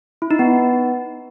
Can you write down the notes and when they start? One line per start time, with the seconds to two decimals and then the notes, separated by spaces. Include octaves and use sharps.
0.22 E4
0.31 D#4
0.39 B3